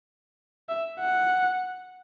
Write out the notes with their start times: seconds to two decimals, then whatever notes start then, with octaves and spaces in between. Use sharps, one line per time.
0.69 E5
1.00 F#5